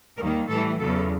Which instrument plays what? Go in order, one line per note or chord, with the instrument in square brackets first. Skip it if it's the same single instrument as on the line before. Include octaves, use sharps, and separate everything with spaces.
[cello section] D#2 D#3 G3 A#3 A#4
A2 E3 G3 A4
E2 C#3 F#3 A4